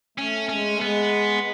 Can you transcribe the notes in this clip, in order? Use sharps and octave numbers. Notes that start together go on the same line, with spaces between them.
A3 C#4
G#3 C#4
A3
G#3 B3